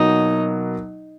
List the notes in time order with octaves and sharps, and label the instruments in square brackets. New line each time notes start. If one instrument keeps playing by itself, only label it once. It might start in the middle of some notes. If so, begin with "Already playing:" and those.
Already playing: [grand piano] B2 F#3 A#3 [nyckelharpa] D#4